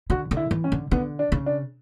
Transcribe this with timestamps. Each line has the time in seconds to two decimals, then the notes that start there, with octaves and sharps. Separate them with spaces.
0.10 D3 F#4
0.31 D3
0.37 E4
0.51 E3
0.64 C#4
0.72 D3
0.91 D3 B3
1.19 D4
1.32 C#3
1.46 D4